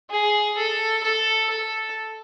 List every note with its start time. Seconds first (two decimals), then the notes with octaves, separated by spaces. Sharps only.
0.11 G#4
0.57 A4
1.04 A4
1.50 A4